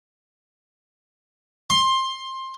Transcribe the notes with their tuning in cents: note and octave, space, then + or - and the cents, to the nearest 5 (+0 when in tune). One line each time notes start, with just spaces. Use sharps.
C6 +15